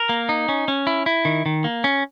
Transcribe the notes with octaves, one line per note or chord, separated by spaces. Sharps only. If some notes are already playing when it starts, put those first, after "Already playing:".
Already playing: A#4
A#3
D#4
C#4
C#4
E4
E4
D#3
D#3
A#3
C#4